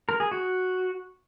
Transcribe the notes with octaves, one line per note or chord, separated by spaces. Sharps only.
A#4
G#4
F#4